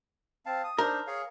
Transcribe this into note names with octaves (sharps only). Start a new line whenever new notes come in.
C4 F5 A5
D#6
D4 D#4 A#4 C5
G#4 C#5 F5